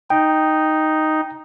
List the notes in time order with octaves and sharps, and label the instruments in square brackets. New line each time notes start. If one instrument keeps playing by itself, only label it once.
[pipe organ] D#4 [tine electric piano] G5